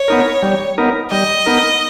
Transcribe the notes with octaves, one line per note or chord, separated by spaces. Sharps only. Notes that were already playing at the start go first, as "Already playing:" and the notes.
Already playing: C#5
B3 D#4 A#4
G3
B3 D#4 A#4
G3 D#5
B3 D#4 A#4